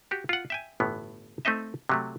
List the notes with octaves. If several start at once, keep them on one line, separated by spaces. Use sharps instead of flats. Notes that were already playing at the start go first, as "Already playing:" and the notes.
F#4 G4
F4 F#5
E5 G5 G#5
G1 A2 E3 B3
A3 C4 D#4 D#5 E5
C3 F#3 A3